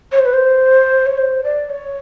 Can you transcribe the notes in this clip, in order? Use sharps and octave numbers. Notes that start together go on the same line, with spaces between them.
C#5
C5
B4
C5
C#5
C5
D5
C#5